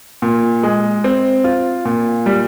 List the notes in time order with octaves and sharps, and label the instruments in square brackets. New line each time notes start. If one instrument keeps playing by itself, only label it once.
[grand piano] A#2
G#3
C4
F4
A#2
G3